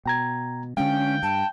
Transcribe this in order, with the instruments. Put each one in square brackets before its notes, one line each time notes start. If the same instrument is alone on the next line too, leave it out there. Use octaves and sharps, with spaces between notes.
[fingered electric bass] B2 [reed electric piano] G5 A#5 G#6
[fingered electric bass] D3 G#3 [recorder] C#4 [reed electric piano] F5 [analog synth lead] G5
[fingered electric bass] G2 [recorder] A5